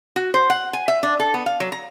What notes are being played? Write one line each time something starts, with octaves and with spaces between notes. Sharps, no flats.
F#4
C5
F#5
G#5
E5
D4
A4
B3
F5
F#3
A#5